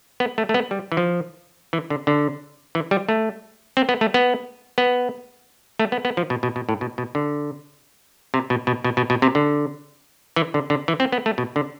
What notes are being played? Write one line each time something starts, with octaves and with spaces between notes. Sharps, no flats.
B3
A3
A3
B3
G3
E3
F3
E3
D3
D3
E3
G3
A3
C4
B3
A3
B3
B3
A3
B3
B3
F3
B2
B2
B2
A2
B2
B2
D3
C3
B2
B2
B2
B2
B2
C3
D3
E3
D3
D3
E3
C4
B3
A3
B2
D3